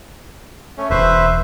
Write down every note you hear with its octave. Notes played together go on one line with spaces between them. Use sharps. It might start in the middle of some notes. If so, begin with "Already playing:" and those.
A3 C#4
E1 B4 C5 E5